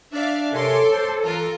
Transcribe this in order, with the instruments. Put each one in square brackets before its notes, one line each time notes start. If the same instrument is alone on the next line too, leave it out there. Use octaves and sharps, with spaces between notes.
[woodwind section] D4 [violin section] D5 E5 F5
[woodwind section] C3 A#4 G#5 [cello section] A4 [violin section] C#5 C6 D6
[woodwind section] C5
[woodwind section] E3 [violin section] F4 A#4 A#5